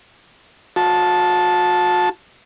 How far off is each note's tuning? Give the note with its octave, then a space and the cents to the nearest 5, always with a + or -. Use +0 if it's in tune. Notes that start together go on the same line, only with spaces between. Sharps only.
F#4 -40 A5 -10